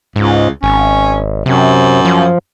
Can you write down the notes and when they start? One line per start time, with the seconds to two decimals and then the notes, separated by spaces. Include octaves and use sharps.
0.16 C#2 G#2
0.63 G#1 C#4
1.46 F#2 C3
2.05 F3